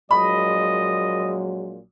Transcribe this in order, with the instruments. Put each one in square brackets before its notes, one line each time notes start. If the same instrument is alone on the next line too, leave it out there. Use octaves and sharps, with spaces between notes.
[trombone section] A#1 A#2 G#3 [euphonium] F#3 [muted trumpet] D#5 [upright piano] B5